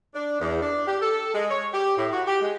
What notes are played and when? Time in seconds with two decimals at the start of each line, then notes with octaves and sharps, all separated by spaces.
0.15 D4
0.41 E2
0.61 D4
0.87 G4
1.02 A4
1.34 G#3
1.50 C#5
1.73 G4
1.97 A2
2.13 F#4
2.27 G4
2.41 G#3